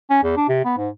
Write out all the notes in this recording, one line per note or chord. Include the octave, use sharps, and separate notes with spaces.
C#4
E2
D4
C3
B3
G#2